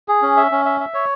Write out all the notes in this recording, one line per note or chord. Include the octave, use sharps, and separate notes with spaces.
G#4
C#4
E5
C#4
E5
E5
C#5